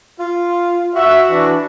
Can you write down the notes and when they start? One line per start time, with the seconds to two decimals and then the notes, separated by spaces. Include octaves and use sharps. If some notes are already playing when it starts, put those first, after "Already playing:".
0.19 F4
0.95 F#4 E5
1.30 E3 D4